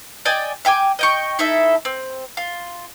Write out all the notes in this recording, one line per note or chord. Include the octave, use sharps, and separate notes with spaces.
D5 D#5 G5 G#5
E5 G5 G#5 D6
D#5 G5 C#6
D#4 E4 A4 E5
C4
F4